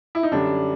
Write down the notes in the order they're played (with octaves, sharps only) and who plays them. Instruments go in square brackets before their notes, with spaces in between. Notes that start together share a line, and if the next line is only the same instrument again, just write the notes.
[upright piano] E4
D#4
F#2 D3 G3 D4